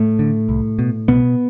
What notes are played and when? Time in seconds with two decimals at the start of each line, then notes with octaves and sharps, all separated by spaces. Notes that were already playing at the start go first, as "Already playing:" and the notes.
Already playing: A2 A3
0.19 D3
0.49 C2
0.79 B2
1.08 C2 B2 B3